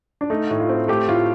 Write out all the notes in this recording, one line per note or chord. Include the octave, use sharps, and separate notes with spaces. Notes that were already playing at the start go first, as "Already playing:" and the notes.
D4
A3 D#4
A2
F4
C4
A3 G4
A2 F4